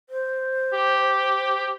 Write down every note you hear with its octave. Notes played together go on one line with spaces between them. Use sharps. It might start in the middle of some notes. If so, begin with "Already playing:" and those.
C5
G4